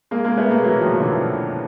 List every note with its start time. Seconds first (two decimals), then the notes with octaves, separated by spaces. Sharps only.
0.11 G#3 A#3
0.25 G#3 A#3
0.38 A3 B3
0.51 G#3 A#3
0.64 E3 F#3
0.81 D#3 F3
0.99 D3 E3